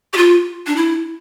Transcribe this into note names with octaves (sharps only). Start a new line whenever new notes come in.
G4
F4
D4
E4